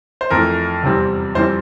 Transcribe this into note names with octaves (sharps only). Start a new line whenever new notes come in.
C5
F2 E3 A3 A#4
E2 C3 G3 C4
F2 E3 G3 C4 C5